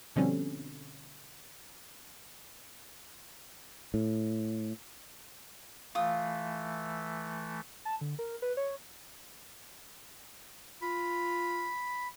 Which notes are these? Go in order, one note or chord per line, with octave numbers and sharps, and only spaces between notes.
B2 D3 F3 G3 C4 C#4
A2
E3 A3 F4 D#6
A5
D3
A#4
B4
C#5
F4 B5